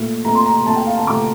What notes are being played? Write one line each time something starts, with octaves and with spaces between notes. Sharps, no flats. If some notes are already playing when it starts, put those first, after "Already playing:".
Already playing: A#2 A3
A#2 A3 A#5
C6
A#5
A#2 A3 A5
G5
F5
A5
A#2 A3 D6